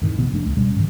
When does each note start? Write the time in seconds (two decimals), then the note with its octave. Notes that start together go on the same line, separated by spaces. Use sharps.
0.02 F2 A2 D#3
0.16 A#1 C3 B3
0.32 F1 F2 A3 D4
0.46 C#2
0.57 E1 B2 G3 C#4
0.76 G#2 D3 D#3